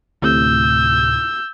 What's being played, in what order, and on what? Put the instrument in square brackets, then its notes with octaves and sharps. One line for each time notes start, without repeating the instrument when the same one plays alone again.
[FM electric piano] D2 A2 C3 [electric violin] E6 G6